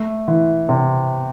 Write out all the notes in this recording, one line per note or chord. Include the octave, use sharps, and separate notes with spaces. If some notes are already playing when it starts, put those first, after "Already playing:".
Already playing: A3
E3
C3